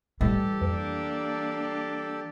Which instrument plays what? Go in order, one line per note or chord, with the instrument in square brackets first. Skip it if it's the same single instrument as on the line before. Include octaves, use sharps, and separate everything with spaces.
[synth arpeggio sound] A2 [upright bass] E3 G3 [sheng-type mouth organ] G4 A4
[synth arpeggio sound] F2 [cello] A#3 D4